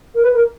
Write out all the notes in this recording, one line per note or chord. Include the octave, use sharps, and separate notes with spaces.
A#4
B4
A#4